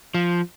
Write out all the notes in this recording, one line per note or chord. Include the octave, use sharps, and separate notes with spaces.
F3